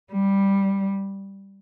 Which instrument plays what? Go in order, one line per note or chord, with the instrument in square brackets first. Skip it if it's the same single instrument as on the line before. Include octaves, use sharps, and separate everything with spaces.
[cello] G3